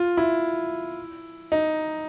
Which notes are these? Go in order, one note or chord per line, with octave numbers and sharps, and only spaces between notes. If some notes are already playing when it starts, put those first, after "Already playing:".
Already playing: F4
E4
D#4